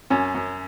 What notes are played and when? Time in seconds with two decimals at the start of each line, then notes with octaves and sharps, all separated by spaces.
0.10 F#2 C#4
0.35 F#2